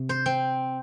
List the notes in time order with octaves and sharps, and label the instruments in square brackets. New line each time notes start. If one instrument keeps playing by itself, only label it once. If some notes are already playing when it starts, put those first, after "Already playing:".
Already playing: [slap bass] C3
[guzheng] C5
C4